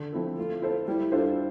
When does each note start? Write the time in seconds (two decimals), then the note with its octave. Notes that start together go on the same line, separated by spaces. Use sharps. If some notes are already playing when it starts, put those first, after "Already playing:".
Already playing: D3
0.13 F3 C4 E4 A4
0.38 A3 F4
0.62 E4 A4 C5
0.87 G3 E4
1.12 D4 F4 A4 C5